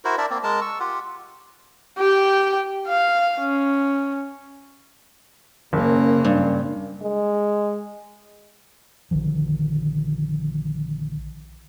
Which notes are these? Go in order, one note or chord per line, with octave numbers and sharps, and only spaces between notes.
E4 F#4 A#4 C5
D4 A#4 D5 E5
A#3 C4
G#3 A#4 A5
C#6 E6
F4 G4 F#5
G4 G5
F5
C#4
F#1 C#3 A#3
G2
G#3
A#1 D3 D#3 F3